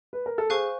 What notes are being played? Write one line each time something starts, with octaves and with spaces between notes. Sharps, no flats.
B4
A#4
A4
G#4 C5 F5 G#5 C#6 F#6